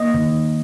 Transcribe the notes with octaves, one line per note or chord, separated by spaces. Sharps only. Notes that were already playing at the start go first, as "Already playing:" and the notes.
Already playing: A#3 D#5
D#3